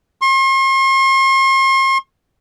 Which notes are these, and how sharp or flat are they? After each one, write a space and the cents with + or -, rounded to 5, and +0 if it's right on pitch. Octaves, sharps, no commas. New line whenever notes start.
C6 +45